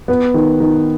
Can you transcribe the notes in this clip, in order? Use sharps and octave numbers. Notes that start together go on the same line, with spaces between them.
B3
D#3
D#3